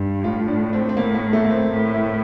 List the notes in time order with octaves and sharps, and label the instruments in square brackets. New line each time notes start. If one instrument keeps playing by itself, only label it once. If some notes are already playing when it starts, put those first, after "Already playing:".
Already playing: [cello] G2
[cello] A2 [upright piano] F4
[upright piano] D4
C4
C4
[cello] A2 [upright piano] A#3
[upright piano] A#3
A3
A#3
C4
[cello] A2
[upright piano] E4